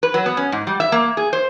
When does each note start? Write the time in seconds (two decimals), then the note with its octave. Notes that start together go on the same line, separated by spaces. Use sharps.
0.03 B4
0.14 F#3
0.26 B3
0.37 C#4
0.52 G#2
0.67 G3
0.80 E5
0.92 A#3
1.17 G#4
1.33 C5